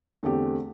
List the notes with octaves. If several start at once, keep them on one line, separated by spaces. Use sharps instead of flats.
E2 D3 A3 C4 G4